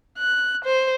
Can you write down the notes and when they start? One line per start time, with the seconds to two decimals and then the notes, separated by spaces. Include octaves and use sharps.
0.18 F#6
0.64 C5